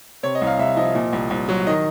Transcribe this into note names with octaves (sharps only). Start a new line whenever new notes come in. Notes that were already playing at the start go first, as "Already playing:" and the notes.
C3 C#5
D#5
C2
F5
C2 E5
F3 D#5
A#2
C2
C2
F#3
D#3 D#5